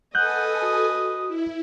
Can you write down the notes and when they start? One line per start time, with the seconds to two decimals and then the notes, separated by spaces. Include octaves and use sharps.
0.15 A4 B4 D#5 F#5 G#5 F#6 G6
0.62 F#4 D#6
1.27 E4